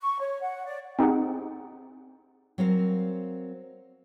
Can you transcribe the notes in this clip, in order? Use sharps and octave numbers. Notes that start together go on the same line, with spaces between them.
C#6
C#5
F#5
D5
C4 D#4 G4 G#4 F#5
F#3 C4 A#4 F5